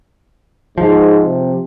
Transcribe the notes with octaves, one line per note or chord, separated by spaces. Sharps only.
G#2 F3
C3